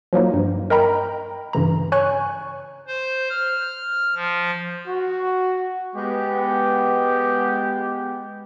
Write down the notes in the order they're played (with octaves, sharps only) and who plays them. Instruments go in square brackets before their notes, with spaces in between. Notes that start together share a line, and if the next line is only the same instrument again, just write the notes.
[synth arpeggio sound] F3 F#3 A#3 D#4
G2
A#4 D#5 G5 A#5 B5
G2 C#3 E3 A#5
C#5 G#5 C#6 F#6
[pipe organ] C5
F6
F3
[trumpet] F#4
[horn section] G#3 B3 G4